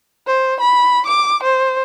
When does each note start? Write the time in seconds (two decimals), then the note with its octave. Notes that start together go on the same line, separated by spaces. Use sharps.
0.27 C5
0.60 B5
1.06 D6
1.43 C5